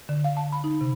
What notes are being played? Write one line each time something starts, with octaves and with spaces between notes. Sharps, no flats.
D3
F5
A5
B5
D#4
C3